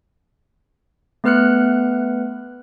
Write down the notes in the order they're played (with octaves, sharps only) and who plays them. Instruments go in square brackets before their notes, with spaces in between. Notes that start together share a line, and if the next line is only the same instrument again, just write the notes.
[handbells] A3 B3 B4 F6 F#6 C#7